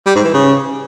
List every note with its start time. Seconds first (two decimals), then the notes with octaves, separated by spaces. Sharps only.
0.06 G3
0.15 G#2
0.25 E3
0.34 C#3